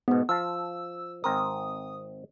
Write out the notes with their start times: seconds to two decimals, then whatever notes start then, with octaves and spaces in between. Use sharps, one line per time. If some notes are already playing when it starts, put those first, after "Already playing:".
0.08 G#2 B2 B3
0.29 F3 F5 A5 E6
1.24 G#1 C4 A#4 D#6